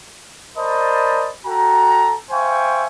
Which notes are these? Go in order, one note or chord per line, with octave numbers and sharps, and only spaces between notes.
A#4 C5 D5 D#5 A5 B5
F#4 A4 G5 A#5
C5 E5 F5 G5 G#5 C#6